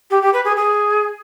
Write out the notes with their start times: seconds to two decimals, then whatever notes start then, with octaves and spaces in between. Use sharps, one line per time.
0.10 G4
0.22 G4
0.33 B4
0.45 G#4
0.56 G#4